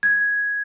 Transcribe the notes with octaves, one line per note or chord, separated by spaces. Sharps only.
G#6